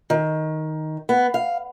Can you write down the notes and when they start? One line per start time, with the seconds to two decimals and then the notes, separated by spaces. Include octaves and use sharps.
0.10 D#3
1.09 B3
1.34 F5